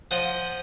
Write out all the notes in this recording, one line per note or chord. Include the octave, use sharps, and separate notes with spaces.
F3 D#5 F#5